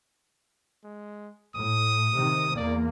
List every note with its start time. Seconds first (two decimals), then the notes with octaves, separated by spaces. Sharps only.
0.84 G#3
1.55 A2 D#6
2.13 C3 D#3
2.56 E2 A#3 D5